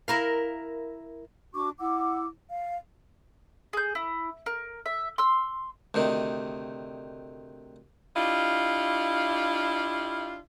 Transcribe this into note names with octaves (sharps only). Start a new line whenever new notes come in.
E4 A#4 F5
D4 F#4 C#6 D6
E4 F#5 D6 E6
F5
G#4 G6
E4
A#4
E5
C6 E6
D2 C3 D#3
D4 E4 F4 G4 D#5 F5